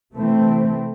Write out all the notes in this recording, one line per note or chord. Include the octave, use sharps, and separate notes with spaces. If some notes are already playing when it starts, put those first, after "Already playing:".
C3 E3 A3 C4